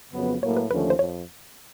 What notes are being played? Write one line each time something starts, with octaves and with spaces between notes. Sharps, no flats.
F2 C#3 F#3 B3
A2 F#3 A#3 C#5
B4
D#2 D3 F3 A3 C#4 B4
C5
F2 C#5